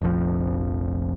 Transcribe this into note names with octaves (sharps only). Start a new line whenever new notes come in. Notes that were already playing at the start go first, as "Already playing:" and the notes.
F1 A#1 F2 F3